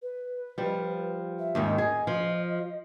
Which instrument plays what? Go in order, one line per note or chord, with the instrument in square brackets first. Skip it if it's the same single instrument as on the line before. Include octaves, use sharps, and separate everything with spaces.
[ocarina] B4
[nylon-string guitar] F3 G3
[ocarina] E5
[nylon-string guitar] D#2 G#2 D#3
[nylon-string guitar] G#4 [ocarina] D#5
[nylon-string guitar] F3